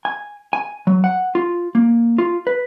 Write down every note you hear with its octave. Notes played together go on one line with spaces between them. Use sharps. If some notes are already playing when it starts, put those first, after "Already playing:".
G#5
G#5
F#3
F#5
F4
A#3
F4
B4